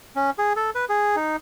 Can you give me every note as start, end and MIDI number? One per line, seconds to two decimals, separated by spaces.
0.16 0.30 61
0.38 0.53 68
0.56 0.70 69
0.75 0.85 71
0.89 1.16 68
1.16 1.36 63